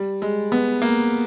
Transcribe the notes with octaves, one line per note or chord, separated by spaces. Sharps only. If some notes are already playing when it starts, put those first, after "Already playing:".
Already playing: G3
G#3
B3
A#3